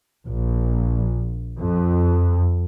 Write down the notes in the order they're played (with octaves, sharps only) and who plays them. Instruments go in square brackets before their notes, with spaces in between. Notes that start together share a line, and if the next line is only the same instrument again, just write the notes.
[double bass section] A#1
F2